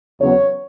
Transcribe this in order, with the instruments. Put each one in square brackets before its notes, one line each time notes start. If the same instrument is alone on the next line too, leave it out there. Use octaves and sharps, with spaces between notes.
[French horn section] E2 C#3 F#3 B3 C#5